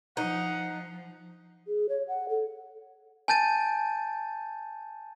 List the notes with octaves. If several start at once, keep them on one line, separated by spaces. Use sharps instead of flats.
F3 D#4 F#5
G#4
C#5
F#5
A4
G#5 A5 G6 A6 D#7